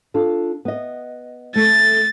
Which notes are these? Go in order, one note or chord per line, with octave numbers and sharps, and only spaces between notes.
D4 F4 A4
B3 D#5
A3 A4 A6